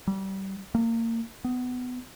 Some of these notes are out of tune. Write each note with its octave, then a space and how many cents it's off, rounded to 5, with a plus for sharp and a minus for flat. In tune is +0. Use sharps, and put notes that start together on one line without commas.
G3 -25
A#3 -30
B3 +20